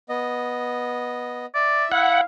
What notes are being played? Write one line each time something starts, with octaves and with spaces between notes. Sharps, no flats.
B3 D#5
D5 E5
E4 F5 F#5